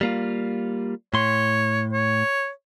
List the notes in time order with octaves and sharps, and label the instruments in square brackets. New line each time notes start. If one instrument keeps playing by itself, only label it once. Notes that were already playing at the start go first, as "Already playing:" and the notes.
[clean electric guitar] G3 A#3 F4
[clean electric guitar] A2 C6 [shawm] C#5
[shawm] C#5